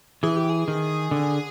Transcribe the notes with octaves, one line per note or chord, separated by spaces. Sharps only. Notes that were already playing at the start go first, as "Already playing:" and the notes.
E3 G#4
G4
G#4
D#3
D3